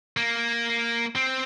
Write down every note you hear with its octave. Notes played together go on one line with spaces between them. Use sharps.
A#3
C4